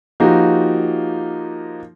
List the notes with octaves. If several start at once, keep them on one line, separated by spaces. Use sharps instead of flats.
F3 A#3 D#4 F#4 G4